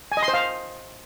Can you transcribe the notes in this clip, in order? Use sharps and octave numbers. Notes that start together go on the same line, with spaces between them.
G#5
D#5
C6
C5
F5